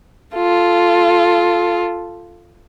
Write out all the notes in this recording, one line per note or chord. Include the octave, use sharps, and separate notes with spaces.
F4 A4